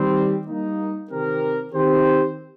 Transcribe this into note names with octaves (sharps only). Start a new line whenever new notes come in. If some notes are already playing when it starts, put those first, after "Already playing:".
Already playing: D#3 G3 C4
G3 A#3 D#4
C3 D#3 C4 G4 A#4
D#3 C4 G4 C5